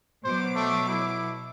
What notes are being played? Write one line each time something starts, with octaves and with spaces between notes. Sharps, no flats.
B2 F#3 C5 D6
A3
E4